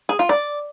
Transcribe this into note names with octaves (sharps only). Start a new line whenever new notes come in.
G#4
F4
D5